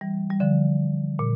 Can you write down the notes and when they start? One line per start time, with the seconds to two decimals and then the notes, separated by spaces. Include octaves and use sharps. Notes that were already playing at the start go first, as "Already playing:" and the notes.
0.01 E3 G3
0.30 G3
0.40 D3 F3
1.19 A#2